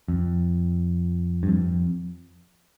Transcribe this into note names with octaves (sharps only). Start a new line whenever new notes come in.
F2
G2
F2